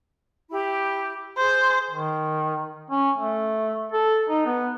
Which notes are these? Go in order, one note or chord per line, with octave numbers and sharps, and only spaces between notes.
E4 G4 B5
G#4 C5 G6
D#3
C#4
A3
A4
D#4
B3